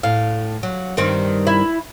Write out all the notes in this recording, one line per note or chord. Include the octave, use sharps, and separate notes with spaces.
A2 F5
F#3
G2 D#3 C4
E4